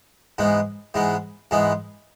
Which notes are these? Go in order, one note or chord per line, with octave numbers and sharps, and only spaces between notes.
G#2 E3 G#3 B3
G#2 E3 G#3 B3
G#2 E3 G#3 B3